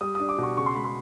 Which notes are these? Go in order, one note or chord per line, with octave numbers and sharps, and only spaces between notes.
G3 D#6
D4 D#6
D6
B2 C#6
C#3 C#6
C6
G#3 B5
C6